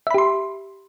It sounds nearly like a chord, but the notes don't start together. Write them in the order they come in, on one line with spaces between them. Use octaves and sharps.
E5 B5 G4 C6